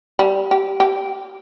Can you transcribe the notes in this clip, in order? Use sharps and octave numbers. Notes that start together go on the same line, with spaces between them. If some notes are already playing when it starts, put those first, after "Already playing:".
G3
G4
G4